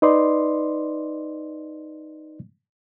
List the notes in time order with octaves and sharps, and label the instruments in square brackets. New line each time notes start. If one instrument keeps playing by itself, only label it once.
[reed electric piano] D#4 B4 D5 D#5 C6